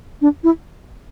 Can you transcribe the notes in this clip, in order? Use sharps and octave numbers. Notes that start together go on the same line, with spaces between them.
D4
E4